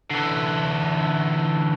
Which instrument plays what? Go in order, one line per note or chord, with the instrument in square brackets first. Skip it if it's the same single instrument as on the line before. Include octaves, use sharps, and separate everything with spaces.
[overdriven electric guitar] D3 E3